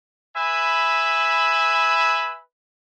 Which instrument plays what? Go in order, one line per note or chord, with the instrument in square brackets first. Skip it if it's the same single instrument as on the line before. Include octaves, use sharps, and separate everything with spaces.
[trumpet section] B4 E5 G#5 B5